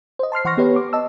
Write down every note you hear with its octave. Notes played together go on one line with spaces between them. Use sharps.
C5 D#5
A5 C6 F6 C7
E3 F#5 C6 C#6 F6 A#6
B3 G4 B4 C#5
D6
D#5 A5 E6